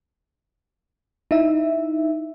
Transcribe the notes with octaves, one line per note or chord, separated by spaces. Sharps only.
D#4 E4 E5